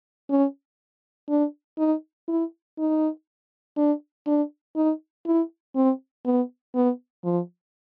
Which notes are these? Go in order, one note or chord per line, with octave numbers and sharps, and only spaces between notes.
C#4
D4
D#4
E4
D#4
D4
D4
D#4
E4
C4
B3
B3
F3